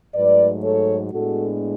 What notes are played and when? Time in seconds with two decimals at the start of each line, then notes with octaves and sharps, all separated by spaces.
0.14 G#2 F#3 A3 B4 D5
0.64 A4 C#5
1.12 A2 G#3 B3 D4 F#4 A4